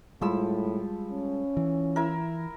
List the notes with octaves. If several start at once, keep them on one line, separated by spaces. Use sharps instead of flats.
A2 F3 G3 G#3 B5 E6
C#4
E3
E4 A#4